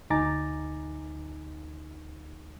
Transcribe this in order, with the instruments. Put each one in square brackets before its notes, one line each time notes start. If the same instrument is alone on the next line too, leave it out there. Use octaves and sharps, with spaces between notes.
[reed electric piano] D2 D#4 G#5 A#5 D6 A6